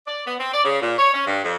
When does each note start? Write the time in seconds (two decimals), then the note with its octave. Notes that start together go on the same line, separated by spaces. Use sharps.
0.07 D5
0.26 B3
0.39 C4
0.53 D5
0.64 C#3
0.81 A#2
0.98 C#5
1.13 C#4
1.26 G2
1.44 F2